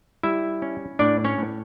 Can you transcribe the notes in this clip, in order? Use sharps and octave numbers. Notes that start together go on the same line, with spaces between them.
G3 E4 E5
C#4
A2 D4 D5
C#4 C#5
A2